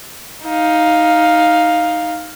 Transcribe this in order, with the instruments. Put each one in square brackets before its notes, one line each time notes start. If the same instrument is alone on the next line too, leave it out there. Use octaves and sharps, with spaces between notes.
[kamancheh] D#4 F5